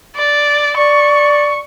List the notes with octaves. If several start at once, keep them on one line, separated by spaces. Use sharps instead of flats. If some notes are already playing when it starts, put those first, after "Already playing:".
D5
D5 C#6